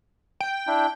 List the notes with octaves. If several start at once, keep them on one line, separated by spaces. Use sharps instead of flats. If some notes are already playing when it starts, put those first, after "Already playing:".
G5
D4 E4